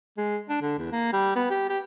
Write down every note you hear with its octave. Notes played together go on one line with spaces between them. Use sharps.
G#3
D4
D3
E2
A#3
G3
B3
G4
G4